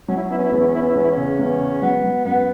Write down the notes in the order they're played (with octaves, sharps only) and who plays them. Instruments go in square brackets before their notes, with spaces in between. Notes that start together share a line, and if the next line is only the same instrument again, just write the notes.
[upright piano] F#3 [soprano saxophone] C#4
[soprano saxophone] E4
C#4
[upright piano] B3 [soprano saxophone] E4
[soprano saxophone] C#4
E4
[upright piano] E2 [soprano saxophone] C#4
[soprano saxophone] E4
C#4
[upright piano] B3 [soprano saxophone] E4
[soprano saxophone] C#4
E4
[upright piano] E2 [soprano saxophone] C#4
[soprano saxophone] E4
C#4
[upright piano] C#3
E2
C#3
[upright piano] F#3 [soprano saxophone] B3
[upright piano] F#3
[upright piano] F#2 [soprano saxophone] B3